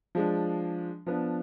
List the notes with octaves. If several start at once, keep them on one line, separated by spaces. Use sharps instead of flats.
F3 G#3 D4
F3 B3 D4